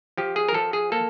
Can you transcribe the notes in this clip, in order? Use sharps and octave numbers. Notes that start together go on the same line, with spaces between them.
F3 G4
G#4
A#4
F3 A4
G#4
A#3 A4